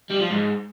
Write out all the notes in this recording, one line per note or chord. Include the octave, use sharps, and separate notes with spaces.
G3
F3
G#2